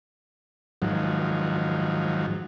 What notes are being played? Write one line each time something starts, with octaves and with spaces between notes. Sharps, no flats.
G#2 D#3 F3 F#3